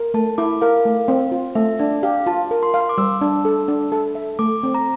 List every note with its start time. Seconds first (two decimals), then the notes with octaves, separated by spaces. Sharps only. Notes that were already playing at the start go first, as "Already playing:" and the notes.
Already playing: A#4
0.14 A3 A5
0.38 E4 D6
0.61 A#4 F5
0.85 A3
1.08 C4
1.32 F4
1.55 A3 E5
1.79 D4 D5
2.03 G4 F5
2.26 F4 A5
2.51 A#4
2.63 C6
2.74 F5
2.81 C6
2.89 D6
2.98 G3 E6
3.21 D4
3.45 A4
3.68 D4
3.92 A4
4.15 E5
4.39 A3 D6
4.63 C4
4.74 A#5